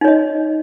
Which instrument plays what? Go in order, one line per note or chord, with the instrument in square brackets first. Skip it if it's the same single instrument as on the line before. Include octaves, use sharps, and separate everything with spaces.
[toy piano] D#4
C#5
D#5